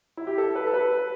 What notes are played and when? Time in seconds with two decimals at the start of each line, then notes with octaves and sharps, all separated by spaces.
0.17 E4
0.27 G4
0.38 A4
0.55 B4
0.67 A4
0.73 B4